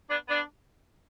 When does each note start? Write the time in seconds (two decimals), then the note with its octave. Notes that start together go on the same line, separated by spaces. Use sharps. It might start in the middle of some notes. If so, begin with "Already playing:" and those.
0.10 B3 D4
0.29 B3 D4